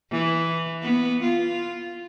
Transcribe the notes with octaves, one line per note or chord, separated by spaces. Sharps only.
E3
B3
F4